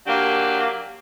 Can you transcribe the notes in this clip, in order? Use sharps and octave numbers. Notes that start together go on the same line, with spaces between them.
F#3 A#3 D4 G4